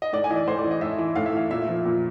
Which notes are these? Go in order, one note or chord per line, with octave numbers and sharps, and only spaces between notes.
D#5
A2 D5
G#5
E3 D#5
D5
A2 C5
D5
E3
D#5
A2 E5
E3
A2 F5
E5
E3 F5
A#2 E5
F3
A#2